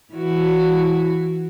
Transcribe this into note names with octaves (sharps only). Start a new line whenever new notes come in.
E3 E4 F#4